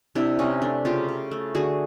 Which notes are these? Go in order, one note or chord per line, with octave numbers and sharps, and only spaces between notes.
C3 D4 E4
C3 C#4 D#4
A3 D4
C#3 F4 G4
C#3
A3
D3 F#4 G#4